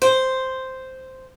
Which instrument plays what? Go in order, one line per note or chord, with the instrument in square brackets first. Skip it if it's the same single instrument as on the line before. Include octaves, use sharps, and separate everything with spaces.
[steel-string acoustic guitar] C5